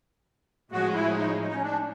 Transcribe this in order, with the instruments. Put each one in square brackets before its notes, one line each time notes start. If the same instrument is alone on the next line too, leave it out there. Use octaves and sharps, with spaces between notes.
[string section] A2 F3 G#3 C#4 [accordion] F#4
[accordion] E4
D#4
D#4
C#4
D4